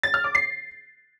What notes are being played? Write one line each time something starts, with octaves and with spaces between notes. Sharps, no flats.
A6
F6
D6
C7